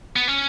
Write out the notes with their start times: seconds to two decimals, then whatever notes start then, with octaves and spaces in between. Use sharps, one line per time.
0.16 B3
0.28 C#4